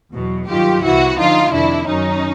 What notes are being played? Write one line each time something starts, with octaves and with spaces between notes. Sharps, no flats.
E2 B2 F#3
G2 D#3 F#3 F4 G4
C2 C3 E3 E4 F#4
D2 D3 F3 D#4 F4
F2 C3 D#3 D4 E4
F#2 D#3 F#3 C#4 D#4